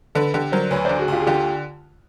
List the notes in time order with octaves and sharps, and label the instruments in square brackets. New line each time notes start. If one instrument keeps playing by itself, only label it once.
[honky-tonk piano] D3 [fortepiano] A4 B4
[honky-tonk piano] D3 [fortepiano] G4 A4
[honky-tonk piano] F#3 [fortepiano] A#4 C5
[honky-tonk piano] D2 [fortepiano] B4 C#5
[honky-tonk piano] D3 [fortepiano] C5 D5
[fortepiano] F#4 G#4
[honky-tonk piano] D2 [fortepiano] F4 G4
[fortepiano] G#4
[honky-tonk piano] D3 [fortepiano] F4 G4